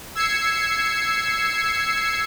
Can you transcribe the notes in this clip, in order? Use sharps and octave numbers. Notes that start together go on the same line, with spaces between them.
E6 G#6 C7 C#7